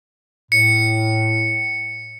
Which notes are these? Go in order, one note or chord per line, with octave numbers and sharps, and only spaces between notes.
A2 C#7